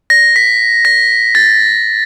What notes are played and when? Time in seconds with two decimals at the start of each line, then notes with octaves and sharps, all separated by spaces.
0.10 A#6
0.36 B6
0.85 A#6
1.35 A6